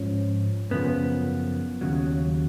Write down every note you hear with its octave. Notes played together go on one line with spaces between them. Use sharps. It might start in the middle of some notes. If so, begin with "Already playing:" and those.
Already playing: G#2 F3 C#4
F#2 C#3 F3 B3
D#2 C#3 F#3